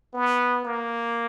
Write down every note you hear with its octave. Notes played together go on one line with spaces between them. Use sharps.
B3
A#3